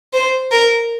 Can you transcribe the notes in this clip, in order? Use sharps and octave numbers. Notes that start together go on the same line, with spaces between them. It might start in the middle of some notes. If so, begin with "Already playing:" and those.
C5
A#4